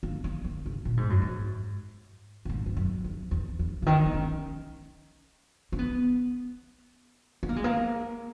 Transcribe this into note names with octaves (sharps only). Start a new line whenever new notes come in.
A#3
A#3
D#3
C#3
A#2
G#2
F#2
G#2
A#2
G#2
G#2
F#2
E2
E2
E2
C#3
D#3
B3
C#4
C#4
B3
B3
A#3
G#3
A#3